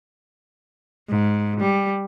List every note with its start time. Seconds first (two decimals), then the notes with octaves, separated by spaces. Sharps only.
1.09 G#2
1.60 G3